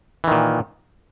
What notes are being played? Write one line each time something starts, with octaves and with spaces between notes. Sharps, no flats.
A#2 D#3 E3